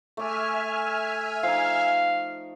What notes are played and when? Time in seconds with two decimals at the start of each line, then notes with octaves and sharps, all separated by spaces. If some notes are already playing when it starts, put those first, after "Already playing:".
0.17 A3 D5 E5 G#5 F6
1.43 F3 D#4 F5